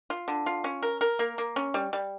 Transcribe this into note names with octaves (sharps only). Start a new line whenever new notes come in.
F4
D3
F4
C#4
A#4
A#4
A#3
A#3
C#4
G3
G3